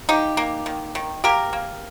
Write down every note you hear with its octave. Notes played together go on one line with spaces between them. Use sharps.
A#3 D#4 G4
A#3
D#3
D#3
A#3 G4 A#4
A#3